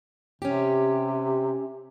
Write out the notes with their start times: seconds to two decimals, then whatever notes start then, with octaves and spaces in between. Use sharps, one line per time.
0.42 C3 C#4 G4